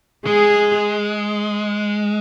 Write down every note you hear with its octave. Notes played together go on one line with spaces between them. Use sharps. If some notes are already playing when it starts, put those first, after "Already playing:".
G#3 G#4